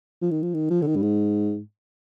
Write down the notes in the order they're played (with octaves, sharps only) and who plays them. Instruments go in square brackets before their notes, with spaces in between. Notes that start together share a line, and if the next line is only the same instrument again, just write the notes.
[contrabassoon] F3
D#3
F3
D#3
F3
D3
D#3
G2
G#2